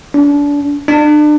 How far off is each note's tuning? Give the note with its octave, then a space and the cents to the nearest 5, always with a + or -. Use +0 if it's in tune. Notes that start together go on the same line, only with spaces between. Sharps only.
D4 -30
D4 +35